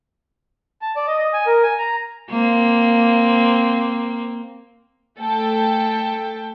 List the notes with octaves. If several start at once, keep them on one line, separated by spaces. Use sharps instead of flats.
A5
D5
D#5
D#5
G#5
A#4
G#5
A#5
A#3 C4
A3 A4 G5